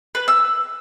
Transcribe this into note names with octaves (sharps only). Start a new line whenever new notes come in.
B4
E6